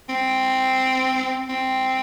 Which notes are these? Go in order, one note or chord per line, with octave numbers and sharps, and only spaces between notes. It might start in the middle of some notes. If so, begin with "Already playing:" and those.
C4
C4